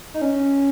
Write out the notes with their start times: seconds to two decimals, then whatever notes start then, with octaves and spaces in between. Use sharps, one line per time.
0.14 D#4
0.21 C#4